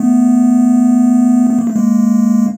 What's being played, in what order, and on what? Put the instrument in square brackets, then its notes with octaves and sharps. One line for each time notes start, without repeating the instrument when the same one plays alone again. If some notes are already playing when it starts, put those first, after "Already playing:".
Already playing: [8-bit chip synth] A3 B3
B3
A#3
A3
G#3 A#3